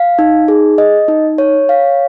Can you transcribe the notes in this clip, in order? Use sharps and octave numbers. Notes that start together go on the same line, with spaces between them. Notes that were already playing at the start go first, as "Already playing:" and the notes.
Already playing: F5
D#4
G#4
D#5
D#4
C#5
F5